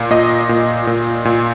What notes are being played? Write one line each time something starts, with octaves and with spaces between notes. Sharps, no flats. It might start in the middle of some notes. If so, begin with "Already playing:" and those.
Already playing: A#2
A#2 D#5
A#2
A#2
A#2